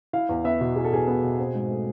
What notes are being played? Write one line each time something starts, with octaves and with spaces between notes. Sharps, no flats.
E4 F5
E2
B3 E5
B2
E4 G#4
A4
E2 G#4
B3
B2
C4
G#2
A3